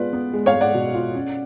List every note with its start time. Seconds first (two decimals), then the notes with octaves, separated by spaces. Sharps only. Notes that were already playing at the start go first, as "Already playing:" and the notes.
Already playing: G#3 B3 F4 B4 D5
0.13 B3
0.34 G#3
0.46 C#5 F5
0.54 G#3
0.61 D5 F#5
0.75 B2
0.94 F4
1.15 C#4